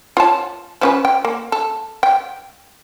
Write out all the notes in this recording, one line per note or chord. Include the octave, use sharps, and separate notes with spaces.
F4 C#5 A5
F3 C#4 B4
G5
A#3
A4
G5